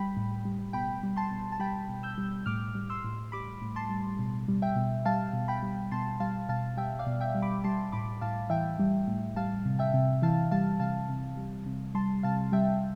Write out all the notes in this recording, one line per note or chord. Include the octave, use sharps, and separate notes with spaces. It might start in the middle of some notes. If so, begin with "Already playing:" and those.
Already playing: G3 G5 B5
A2
G3
B2 G5 B5
G3
A5 C6
B2
A5
G3 G5 B5
B2
E6 G6
G3
A2 D6 F6
G3
C6 E6
A2
G3 B5 D6
A2
A5 C6
G3
B2
G3
E5 G5
B2
G3 F5 A5
B2
G5 B5
G3
B2 A5 C6
G3 F5 A5
B2 F5 A5
G3 E5 G5
D5 F5
B2
E5 G5
G3
B5 D6
G3 A5 C6
A2 B5 D6
A2 F5 A5
E3 E5 G5
G3
A2
G3 F5 A5
C3
E5 G5
C3
E3 F5 A5
G3 F5 A5
C3 F5 A5
C3
G3
C3
G3 A5 C6
C3 F5 A5
G3 E5 G5